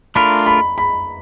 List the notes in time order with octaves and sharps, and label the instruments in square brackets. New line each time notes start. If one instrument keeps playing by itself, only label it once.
[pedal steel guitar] A3 D4 F4 A#4 [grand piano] B5
[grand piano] B5
B5